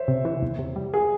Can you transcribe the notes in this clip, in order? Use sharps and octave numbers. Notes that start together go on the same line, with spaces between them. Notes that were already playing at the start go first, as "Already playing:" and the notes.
Already playing: C5 C#5 E5
C3
E3
E2
C3
G3
G#4